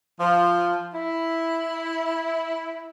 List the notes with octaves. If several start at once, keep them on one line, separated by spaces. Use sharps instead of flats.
F3
E4